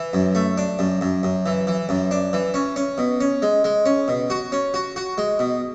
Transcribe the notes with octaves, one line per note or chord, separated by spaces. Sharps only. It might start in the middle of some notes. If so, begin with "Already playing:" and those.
Already playing: E3
F#2
A3
D4
F#2
F#2
F#2
E3
E3
F#2
D4
E3
C#4
C#4
B2
C#4
G#3
G#3
C#4
B2
F#4
C#4
F#4
F#4
G#3
B2